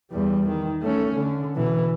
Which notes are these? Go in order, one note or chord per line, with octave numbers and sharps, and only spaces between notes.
E2 G3
D#3
A3 C#4
D3
B2 E3